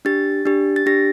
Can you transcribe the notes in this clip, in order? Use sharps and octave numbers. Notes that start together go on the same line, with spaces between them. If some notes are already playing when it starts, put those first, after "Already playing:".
D4 G4 A6
D4 G4
A6
D4 G4 A#6